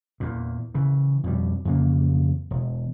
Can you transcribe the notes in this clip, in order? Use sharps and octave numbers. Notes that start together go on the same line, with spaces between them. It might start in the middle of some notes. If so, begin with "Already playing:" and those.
E2 A#2
C#3 E3
F2 B2 G3
F2 C#3 E3 A#3
E1